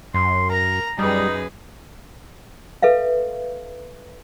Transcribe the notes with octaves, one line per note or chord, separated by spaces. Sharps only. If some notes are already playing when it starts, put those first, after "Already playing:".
F#2 C6
A#4 A#5
F#2 G3 D#4 G#4 B4
A4 B4 E5 F5